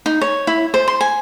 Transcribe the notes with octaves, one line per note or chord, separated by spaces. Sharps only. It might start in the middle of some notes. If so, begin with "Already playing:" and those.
D#4
C#5
E4
C5
C6
G#5